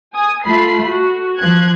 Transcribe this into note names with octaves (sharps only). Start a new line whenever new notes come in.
G#5 D#6
A3 F4 B5 C7
F#4
F3 F#6 G#6